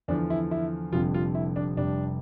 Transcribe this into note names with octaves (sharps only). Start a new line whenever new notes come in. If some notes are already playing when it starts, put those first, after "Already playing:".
E2 D3 F3 D4
E4
E4
F1 F2 D3 G3 F4
F4
E4
D4
F1 F2 C3 G3 D4